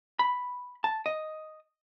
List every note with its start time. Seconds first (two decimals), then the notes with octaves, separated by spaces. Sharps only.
0.19 B5
0.84 A5
1.06 D#5